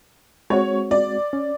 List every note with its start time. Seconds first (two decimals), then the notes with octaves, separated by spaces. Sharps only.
0.50 G#3 C4 F#4 C#5
0.91 D5
1.33 C#4